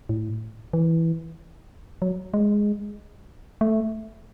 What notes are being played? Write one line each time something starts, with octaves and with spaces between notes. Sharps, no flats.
A2
E3
F#3
G#3
A3